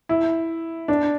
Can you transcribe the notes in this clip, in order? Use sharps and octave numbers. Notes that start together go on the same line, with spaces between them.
E4
D4